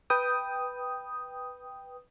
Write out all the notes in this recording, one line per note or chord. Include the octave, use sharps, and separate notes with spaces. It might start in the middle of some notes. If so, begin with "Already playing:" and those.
B4 G5 D#6